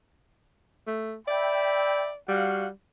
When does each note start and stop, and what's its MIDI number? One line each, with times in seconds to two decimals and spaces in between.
0.87 1.15 57
1.28 2.16 74
1.28 2.10 76
1.28 2.10 79
1.28 2.10 83
2.28 2.70 55
2.28 2.66 66
2.28 2.66 77
2.28 2.66 78